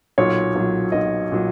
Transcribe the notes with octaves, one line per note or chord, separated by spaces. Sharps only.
B1 A#2 F#3 C#5
B1 A#2 F#3
B1 A#2 F#3 D#5
A#2 F#3